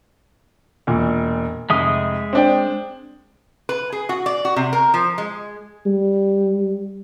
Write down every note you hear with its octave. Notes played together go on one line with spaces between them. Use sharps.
E1 A#2
F1 G#3 E5 D#6
C4 D4 G5
B4
G#4
F#4
D5
F#4
C3
A#4
F3
G#3
G3